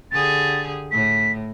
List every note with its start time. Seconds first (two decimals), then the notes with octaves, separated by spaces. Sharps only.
0.12 D3 G4 G#4 A6
0.92 A2 B6